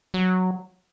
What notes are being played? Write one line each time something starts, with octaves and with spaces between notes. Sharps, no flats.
F#3